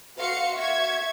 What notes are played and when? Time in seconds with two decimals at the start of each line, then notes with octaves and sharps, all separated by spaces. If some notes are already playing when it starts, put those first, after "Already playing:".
0.18 F#4 F5 C6 C#7
0.56 E5 C#6 G#6